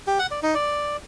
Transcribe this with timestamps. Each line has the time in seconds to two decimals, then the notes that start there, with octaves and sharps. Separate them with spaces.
0.07 G4
0.19 F#5
0.31 D5
0.43 D#4
0.54 D5